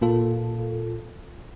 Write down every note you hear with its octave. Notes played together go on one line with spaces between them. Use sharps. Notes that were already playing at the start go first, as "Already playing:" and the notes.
A#2 A#3 F4 A4